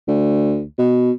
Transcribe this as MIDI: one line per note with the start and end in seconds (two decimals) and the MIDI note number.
0.08 0.64 38
0.79 1.12 47